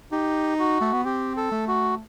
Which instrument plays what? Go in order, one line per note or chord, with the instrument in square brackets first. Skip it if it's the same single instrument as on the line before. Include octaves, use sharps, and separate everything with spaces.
[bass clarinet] D#4 [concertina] G4
[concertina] F#4
[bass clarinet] A3
B3
[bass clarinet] C4 [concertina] G4
[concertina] A4
[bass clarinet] A3
[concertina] F#4